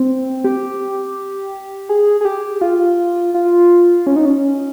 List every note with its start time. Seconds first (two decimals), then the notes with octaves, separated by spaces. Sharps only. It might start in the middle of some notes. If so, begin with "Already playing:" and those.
Already playing: C4
0.44 G4
1.89 G#4
2.21 G#4
2.25 G4
2.61 F4
3.34 F4
4.07 C#4
4.16 D#4
4.25 C#4